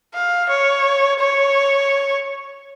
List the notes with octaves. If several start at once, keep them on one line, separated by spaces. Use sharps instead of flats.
F5
C#5
C#5